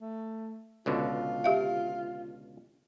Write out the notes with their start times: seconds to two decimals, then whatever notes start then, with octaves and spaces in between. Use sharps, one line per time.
0.01 A3
0.86 C#2 B2 D3 F4
1.44 G4 E5 F5